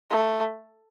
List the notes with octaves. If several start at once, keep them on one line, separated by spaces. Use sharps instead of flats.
A3